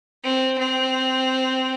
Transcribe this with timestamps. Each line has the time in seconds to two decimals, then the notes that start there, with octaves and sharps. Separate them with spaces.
0.23 C4
0.58 C4